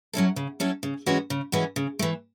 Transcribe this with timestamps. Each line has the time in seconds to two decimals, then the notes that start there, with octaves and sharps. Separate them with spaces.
0.13 F#3 C#4 E4 A4
0.36 C#3
0.60 F#3 C#4 E4 A4
0.83 C#3
1.06 E3 G#3 C#4 F#4
1.30 C#3
1.52 E3 G#3 C#4 F#4
1.76 C#3
1.99 E3 A3